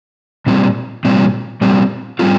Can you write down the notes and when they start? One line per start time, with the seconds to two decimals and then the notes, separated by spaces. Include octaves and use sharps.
0.46 A#2 G3 C4
1.05 A#2 G3 C4
1.61 A#2 G3 C4
2.19 G3 C4 F4